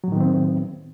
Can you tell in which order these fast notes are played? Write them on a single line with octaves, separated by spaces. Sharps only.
F#3 A2 D#3 B3 C4